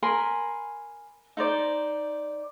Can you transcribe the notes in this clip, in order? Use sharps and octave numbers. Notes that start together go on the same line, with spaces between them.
A#4 G#5 B5 C6
D#4 C5 D5